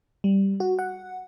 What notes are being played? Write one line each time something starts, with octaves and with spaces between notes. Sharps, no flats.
G3
F#4
F#5